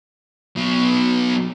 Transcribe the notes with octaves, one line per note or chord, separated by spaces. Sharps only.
B2 F#3